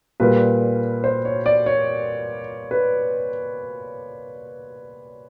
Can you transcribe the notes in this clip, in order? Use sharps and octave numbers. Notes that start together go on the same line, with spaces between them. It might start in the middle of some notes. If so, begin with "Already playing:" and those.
A#2 G3 A#3 B4
C5
C#5
D5
C#5
B4